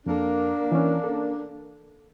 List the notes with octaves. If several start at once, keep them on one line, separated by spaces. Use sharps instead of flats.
F2 A#3 D4 A4
E3 C#4
A4